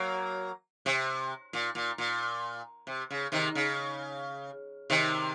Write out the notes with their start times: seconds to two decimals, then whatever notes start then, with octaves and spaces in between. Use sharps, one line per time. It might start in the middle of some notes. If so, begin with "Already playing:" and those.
Already playing: F#3 A#3
0.86 C3
1.53 A#2
1.75 A#2
1.98 A#2
2.87 C3
3.11 C#3
3.32 C3 D#3
3.55 C#3
4.90 C3 D#3